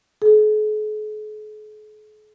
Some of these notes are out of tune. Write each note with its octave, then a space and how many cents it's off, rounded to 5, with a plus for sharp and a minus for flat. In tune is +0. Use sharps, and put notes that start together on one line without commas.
G#4 +45